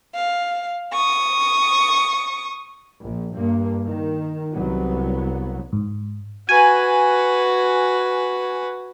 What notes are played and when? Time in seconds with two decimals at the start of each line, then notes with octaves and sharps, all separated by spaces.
0.15 F5
0.93 C#6 D#6
3.01 A#1
3.35 G2 A#3
3.86 D#3
4.52 C2 F#3 B3
5.73 G#2
6.49 F#4 B4 G#5